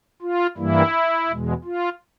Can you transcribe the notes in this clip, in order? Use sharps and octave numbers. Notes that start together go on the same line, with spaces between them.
F4
G2 E3 G3 A#3 E4
E2 B2 G#3
F4